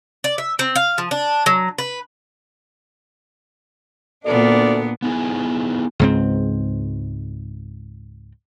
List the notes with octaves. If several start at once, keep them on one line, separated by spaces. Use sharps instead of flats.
D5
E5
C4
F5
F3
D4
F#3
B4
D2 A#2 B3 D4 A4 D5
B3 D#4 E4 G#4
C#2 G#2 C4